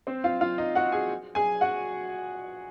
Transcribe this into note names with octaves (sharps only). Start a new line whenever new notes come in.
C4 C5
F4 F5
F4 F5
D#4 D#5
F#4 F#5
G#4 G#5
G#4 G#5
F#4 F#5